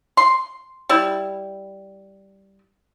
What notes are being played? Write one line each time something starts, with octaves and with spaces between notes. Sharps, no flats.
C6
G3 E4